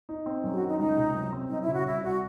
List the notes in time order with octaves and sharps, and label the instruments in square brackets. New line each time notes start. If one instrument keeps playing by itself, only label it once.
[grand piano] D#4
C4
[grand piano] F#2 [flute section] C#4
[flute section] G#4
F#4
[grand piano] D#3
[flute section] D#4
[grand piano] C#2 [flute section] D#4
[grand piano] C3
F#2
C4
[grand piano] F#2 [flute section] D#4
[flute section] E4
[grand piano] C#3
[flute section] F#4
[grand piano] C2 [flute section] E4
[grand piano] C2 [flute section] F#4